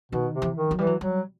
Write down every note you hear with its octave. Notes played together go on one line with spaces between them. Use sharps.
B2 D#3
C3
E3
D#3
F#3
E3 G3
F#3
F#3 G3